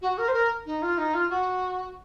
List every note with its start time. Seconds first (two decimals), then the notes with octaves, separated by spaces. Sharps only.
0.02 F#4
0.18 A#4
0.28 C5
0.34 A#4
0.66 D#4
0.82 F4
0.98 D#4
1.14 F4
1.30 F#4